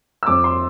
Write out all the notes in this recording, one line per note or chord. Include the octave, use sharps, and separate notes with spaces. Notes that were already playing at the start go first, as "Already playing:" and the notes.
E6
F2 D6
C6